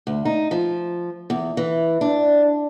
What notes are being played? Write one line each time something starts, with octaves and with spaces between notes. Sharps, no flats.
D2
D#4
F3
E2
E3
D4